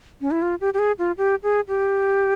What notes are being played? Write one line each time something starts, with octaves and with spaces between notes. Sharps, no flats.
C#4
E4
F4
G4
G4
G#4
F4
G4
G#4
G4